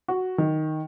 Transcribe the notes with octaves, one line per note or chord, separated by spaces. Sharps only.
F#4
D#3